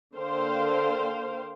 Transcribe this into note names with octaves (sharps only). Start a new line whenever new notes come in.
D3 A#3 C5 F5 G5